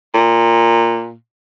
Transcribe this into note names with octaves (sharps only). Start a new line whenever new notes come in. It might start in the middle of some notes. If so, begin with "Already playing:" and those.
A#2